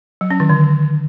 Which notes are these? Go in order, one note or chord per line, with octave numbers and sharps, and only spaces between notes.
F#3
C#4
D#3
D3